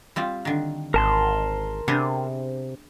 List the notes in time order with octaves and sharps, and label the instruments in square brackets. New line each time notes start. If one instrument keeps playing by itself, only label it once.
[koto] G3 C4 F4
D3 D#3
[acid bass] G#1 [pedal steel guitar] A#4 A5 C6
[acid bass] C3 [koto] B3 D4 G#4